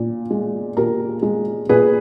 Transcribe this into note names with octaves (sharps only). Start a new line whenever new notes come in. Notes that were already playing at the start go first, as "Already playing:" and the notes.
Already playing: A#2
G#3
A#2 G4 A#4
G#3
A#2 G#4 B4